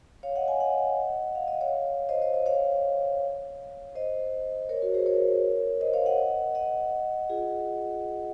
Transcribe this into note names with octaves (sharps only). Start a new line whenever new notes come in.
C#5 F5
D#5 F#5
F5 G#5
D#5 F#5
F5
D#5
C#5 F5
C5 D#5
C5 D#5
C5 D#5
C#5 F5
C5 D#5
A#4 C#5
F#4 A#4
G#4 C5
A#4 C#5
C5 D#5
C#5 F5
D#5 F#5
D#5 F#5
F4 G#4